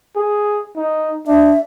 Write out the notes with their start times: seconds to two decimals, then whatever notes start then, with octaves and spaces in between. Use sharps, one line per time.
0.16 G#4
0.76 D#4
1.27 D4 E5